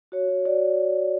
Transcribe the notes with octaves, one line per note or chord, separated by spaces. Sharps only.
F#4 C#5
F#4
F#4 D5